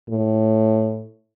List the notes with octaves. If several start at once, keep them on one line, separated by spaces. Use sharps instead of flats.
A2